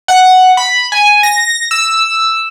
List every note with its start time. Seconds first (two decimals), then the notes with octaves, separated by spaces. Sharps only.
0.08 F#5
0.57 B5
0.92 G#5
1.23 A#6
1.71 E6